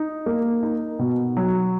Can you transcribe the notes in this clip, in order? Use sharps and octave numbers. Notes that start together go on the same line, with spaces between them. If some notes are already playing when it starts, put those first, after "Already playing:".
Already playing: D#4
A#3
D#4
B2
F#3